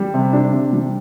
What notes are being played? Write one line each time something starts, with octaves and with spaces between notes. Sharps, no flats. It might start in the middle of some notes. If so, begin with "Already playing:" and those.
Already playing: G3
C3
D4
C3
G3